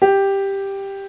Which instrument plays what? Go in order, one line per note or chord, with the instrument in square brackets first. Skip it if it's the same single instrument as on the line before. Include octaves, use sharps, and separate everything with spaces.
[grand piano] G4